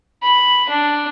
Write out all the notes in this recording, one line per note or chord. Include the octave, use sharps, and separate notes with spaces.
B5
D4